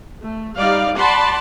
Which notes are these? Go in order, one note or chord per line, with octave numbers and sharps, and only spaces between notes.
A3
G3 D#4 D5 F5
D5 F#5 A5 B5 C6